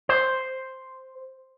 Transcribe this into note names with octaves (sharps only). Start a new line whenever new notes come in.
C5